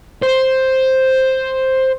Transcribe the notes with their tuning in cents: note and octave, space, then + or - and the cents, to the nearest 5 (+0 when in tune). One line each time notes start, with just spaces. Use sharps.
C5 +5